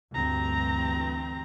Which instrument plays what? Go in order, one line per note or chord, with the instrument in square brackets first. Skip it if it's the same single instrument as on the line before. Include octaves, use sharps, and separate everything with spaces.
[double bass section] D2 G2 E3 [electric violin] C4 A#5